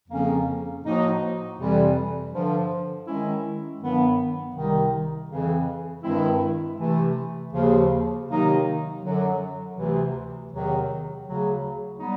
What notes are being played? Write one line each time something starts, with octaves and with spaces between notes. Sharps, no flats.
F2 C#3 F3 A#3 C#4
A2 F3 A#3 D#4 F#4
F2 C3 E3 G3
G2 D3 F3
D#3 G#3 C#4 E4
G2 D#3 F#3 B3
C2 C3 D#3
F2 C#3 E3
G2 D#3 G#3 C4 E4
C3 E3 A3
D#2 C#3 F3
C3 D#3 F#3 A#3 D#4
F#2 D3 F#3
D2 C3 E3
E2 C3 D#3 F#3
D2 C#3 F#3
G3 B3 D#4